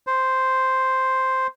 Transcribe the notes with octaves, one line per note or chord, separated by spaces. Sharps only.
C5